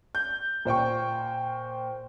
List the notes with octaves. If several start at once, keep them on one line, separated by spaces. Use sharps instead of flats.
G6
A#2 C5 G5 C#6